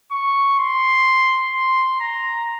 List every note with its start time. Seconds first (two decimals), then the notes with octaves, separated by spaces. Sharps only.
0.12 C#6
0.59 C6
1.54 C6
2.00 A#5